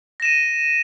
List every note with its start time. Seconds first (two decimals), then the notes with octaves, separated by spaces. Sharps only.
0.20 A#6
0.22 E7
0.25 D#7